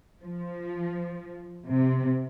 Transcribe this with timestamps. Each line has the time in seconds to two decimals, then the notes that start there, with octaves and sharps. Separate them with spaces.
0.21 F3
1.67 C3